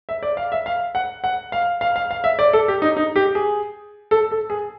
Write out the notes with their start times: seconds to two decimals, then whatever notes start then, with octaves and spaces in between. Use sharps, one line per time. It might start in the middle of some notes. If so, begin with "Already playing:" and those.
0.09 E5
0.23 D5
0.37 F5
0.52 E5
0.66 F5
0.95 F#5
1.24 F#5
1.52 F5
1.81 F5
1.96 F5
2.11 F5
2.24 E5
2.39 D5
2.53 A4
2.68 G4
2.82 D#4
2.97 D#4
3.16 G4
3.35 G#4
4.11 A4
4.31 A4
4.50 G#4